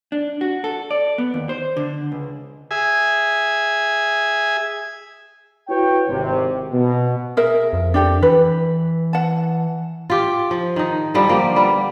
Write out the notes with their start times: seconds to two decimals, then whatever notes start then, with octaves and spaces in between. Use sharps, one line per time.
0.12 D4
0.41 F#4
0.64 A4
0.91 D5
1.18 B3
1.34 D#2
1.49 C5
1.77 D3
2.12 C#2
2.71 G#4 E5 G#5
5.68 E4 F#4 B4 C#5 G5
6.08 G#1 C3
6.71 B2
7.37 G#4 A#4 E5
7.73 F2
7.94 D4 G4 A4
8.22 E3 B4
9.13 F#5 A5
10.10 F4 G4
10.51 F3
10.76 D#3 D#4
11.14 D3 F3 G3
11.27 F3 A#3 G4
11.56 G3 B3